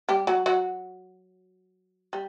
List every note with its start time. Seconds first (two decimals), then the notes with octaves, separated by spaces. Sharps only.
0.09 G3 G4
0.27 F#3 F#4
0.46 F#3 F#4
2.13 G3